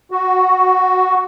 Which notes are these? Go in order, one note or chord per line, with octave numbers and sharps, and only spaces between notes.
F#4